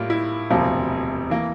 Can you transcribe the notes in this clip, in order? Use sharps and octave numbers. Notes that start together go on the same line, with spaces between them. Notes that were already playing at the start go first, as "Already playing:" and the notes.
Already playing: A2 G3 A#3 F4
E4
E1 D2 C3 F3 A#3
E3 A#3